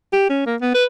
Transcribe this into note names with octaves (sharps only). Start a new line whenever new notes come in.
G4
C#4
A#3
B3
B4